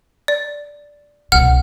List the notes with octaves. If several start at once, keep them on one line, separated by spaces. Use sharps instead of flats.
D5
C2 B2 F#5 F6